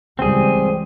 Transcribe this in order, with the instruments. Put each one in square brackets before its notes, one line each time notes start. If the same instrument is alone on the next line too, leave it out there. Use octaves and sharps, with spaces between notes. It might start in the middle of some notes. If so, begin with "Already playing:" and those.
[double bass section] C#2 E3 G3 [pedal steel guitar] C4 G#4